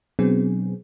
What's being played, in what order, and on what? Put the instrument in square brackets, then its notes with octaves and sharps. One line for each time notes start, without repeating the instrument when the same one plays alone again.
[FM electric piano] B2 F#3 B3 C4 D4 G#4